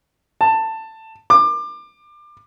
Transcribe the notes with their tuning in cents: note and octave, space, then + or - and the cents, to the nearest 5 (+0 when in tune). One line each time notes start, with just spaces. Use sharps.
A5 +15
D6 +25